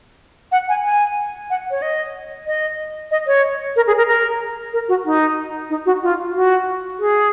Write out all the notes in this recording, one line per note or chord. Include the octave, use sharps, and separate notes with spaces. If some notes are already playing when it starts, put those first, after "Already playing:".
F#5
G#5
G#5
F#5
C#5
D#5
D#5
D#5
C#5
A#4
G#4
A#4
A#4
A#4
F#4
D#4
D#4
F#4
F4
F#4
G#4